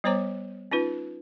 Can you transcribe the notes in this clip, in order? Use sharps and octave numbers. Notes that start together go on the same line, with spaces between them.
G3 B3 C5 C#5 A#5 D6
C#4 D#4 F4 B4